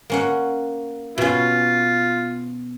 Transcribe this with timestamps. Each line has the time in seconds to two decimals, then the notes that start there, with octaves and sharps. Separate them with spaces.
0.10 A#3 C#4 F#5
1.18 B2 C#4 F4